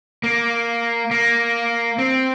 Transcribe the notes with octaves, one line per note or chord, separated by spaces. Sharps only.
A#3
A#3
C4